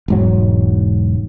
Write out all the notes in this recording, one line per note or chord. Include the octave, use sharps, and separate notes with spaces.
E1 G#2 F#3